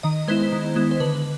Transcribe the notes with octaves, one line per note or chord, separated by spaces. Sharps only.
D#3 D#5
G#3 B3 E4 C5
D#3
G#3 B3 E4
C5
D3 B4